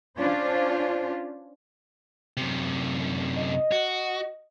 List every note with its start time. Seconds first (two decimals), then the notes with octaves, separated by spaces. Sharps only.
0.18 C#4 D4 F4 C5
2.37 F#2 C3
3.35 D#5
3.72 F#4